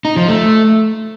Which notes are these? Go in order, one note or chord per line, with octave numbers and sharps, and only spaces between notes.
D#4
F3
A3